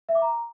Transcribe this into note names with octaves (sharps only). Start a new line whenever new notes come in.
E5
D6
A#5